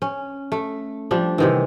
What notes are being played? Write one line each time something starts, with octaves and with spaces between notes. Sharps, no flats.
C#4
A3
F3 G3 D4
C3 D#3 E3